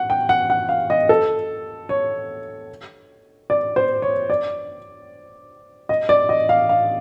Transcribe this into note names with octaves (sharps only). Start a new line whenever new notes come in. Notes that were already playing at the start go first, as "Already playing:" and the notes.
Already playing: F#5
G5
F#5
F#5
F5
D#5
A4
C#5
D5
C5
C#5
D5
D#5
D5
D#5
F5
F5